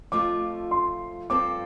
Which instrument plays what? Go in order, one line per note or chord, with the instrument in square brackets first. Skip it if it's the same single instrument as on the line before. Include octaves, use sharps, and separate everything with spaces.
[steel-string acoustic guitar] F2 F3 A3 F4 [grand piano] D6
[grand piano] C6
[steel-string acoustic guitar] G2 F3 C4 F4 A4 [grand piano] D6